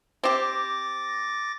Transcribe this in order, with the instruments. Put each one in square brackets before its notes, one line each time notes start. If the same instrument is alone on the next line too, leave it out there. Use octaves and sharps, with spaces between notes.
[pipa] C4 G4 [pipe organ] D6 A6 A#6